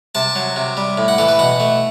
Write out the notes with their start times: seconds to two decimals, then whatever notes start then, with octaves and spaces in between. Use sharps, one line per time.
0.15 C3 A5
0.36 F#3
0.56 C3
0.77 G3
0.98 A2
1.08 F#5
1.18 E3 A4
1.28 B4
1.39 B2 F#5
1.60 A3